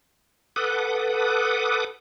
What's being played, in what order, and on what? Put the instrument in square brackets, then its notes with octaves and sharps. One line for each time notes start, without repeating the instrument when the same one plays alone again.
[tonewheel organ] A4 B4 F#5 D6 D#6